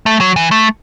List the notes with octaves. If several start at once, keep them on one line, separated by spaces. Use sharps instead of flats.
A3
F#3
E3
A3